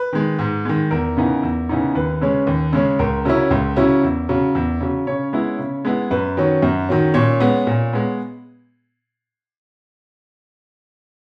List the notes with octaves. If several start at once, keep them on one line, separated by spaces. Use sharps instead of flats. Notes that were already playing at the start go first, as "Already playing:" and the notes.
Already playing: B4
D#3 G#3
G#2
D#3 G#3
E2 A#4
C#3 E3 B3 D#4
E2
C#3 E3 B3 D#4
D#2 B4
C#3 G#3 C#4
D#2
C#3 G#3 C#4
C#2 A#4
C#3 F#3 C#4 E4
C#2
C#3 F#3 C#4 E4
E2
C#3 F#3
E2
C#3 F#3
C#3 C#4 C#5
G#3 B3 E4
C#3
G#3 B3 E4
F#2 B4
D#3 F#3 C#4
F#2
D#3 F#3 C#4
A#2 C#4 C#5
G#3 B3
A#2
G#3 B3